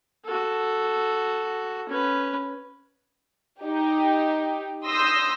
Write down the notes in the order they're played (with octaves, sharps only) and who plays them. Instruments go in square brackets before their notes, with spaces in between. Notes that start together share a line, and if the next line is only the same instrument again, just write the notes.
[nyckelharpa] F#4 A4
C#4 B4
[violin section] D#4 G4
C6 D#6 E6 G6 A#6